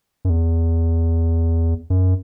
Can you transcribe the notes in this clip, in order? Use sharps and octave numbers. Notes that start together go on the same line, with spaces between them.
F#2
E2
F#2